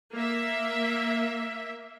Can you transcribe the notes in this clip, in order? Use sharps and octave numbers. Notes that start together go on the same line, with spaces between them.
A#3 E5